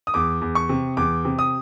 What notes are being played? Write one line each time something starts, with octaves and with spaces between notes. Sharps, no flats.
D#6
E2 D6
E2
C#6
C3
E2 D6
C3
D#6